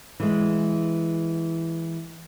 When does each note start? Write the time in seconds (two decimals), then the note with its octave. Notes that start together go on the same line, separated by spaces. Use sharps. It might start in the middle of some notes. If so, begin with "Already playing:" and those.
0.20 E3 G#3